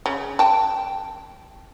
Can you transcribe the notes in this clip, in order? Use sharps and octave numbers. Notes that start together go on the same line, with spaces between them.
C#3
G5 A5